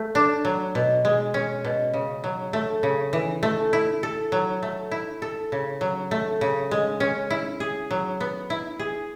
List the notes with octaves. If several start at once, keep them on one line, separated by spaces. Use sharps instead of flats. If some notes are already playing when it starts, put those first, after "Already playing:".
Already playing: A3
D4
F#3
B2
G#3
C#4
B2
C#3
F#3
A3
C#3
E3
A3
E4
A4
F#3
A3
E4
A4
C#3
F#3
A3
C#3
G#3
C#4
E4
G#4
F#3
B3
E4
G#4